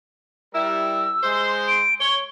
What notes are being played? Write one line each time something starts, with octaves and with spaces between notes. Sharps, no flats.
G3 E4 A#4 E6
G#3 C5 C6
D7
C#5 G7